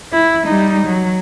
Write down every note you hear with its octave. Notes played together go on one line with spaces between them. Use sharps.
E4
G3 D#4
F#3